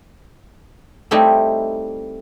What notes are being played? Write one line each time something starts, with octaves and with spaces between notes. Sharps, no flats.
G3 A3 C4 D#4 E4 G4